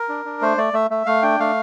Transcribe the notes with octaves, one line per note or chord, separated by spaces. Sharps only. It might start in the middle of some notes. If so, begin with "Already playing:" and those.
Already playing: A#4
D4
D4
A3 C5
A3 D5
A3 E5
A3 E5
A3 F5
D4 G5
A3 F5